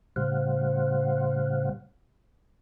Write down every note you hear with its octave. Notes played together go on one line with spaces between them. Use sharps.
A2 C#3 G3 C5 F5 F#5